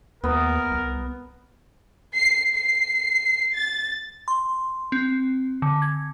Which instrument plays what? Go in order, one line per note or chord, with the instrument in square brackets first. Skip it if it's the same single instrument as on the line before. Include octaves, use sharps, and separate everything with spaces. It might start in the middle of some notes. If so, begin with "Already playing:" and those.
[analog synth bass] D#2 [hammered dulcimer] B3 [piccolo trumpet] A#4
[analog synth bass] C2
[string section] C7
C7
A6
[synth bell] C6
C4
D3
G#6